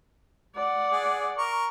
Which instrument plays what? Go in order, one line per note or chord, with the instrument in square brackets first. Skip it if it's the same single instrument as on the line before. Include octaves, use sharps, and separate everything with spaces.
[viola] D5 F#5
[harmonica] G#4
A#4 C#6